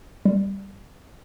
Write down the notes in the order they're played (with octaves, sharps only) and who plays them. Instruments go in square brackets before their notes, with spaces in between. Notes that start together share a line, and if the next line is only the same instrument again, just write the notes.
[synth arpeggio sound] G3